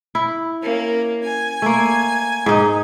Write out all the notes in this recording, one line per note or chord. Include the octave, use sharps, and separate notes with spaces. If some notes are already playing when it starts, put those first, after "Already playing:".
E4
A#3 C#4
G#5
A3 A#3
G#2 D#4